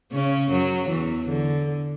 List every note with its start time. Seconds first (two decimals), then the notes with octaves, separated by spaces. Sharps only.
0.12 C#3 C#4
0.51 F#2 F#3
0.89 E2 E3
1.28 D3